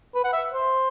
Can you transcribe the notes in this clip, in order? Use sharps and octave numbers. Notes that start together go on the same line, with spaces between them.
B4
F#5
E5
C5